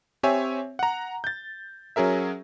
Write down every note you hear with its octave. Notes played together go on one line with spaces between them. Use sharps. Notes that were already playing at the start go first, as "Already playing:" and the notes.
C4 G4 C#5 E5 G#5
F#5 A#5
G6 A6
F#3 C#4 G#4 A#4 E5